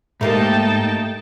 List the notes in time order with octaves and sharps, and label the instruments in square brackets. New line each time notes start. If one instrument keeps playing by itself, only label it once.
[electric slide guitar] G#2 [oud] A3 A#3 G4 [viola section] D#4 G5 A5